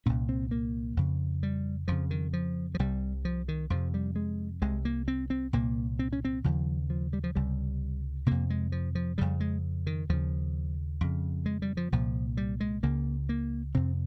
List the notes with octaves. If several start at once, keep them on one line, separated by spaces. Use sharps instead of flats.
C2 A#2 C#4
C4
A#3
F2 C#3
G3
F2 C#3 F3
D#3
F3
F3
C2 C3 G3
F3
D#3
F2 C3 F3
G3
G#3
C2 C3 G#3
A#3
C4
C4
C2 A#2 A#3
C4
C#4
C4
D#2 C#3 F3
F3
G3
F3
C#2 C3 G3
F2 C3 A#3
G#3
F3
F3
F2 C#3 G3
G#3
D#3
D#2 C#3 F3
F2 C#3
G#3
G3
F3
C2 A#2 F3
G3
G#3
C#2 C#3 A#3
A#3
F2 C3 C4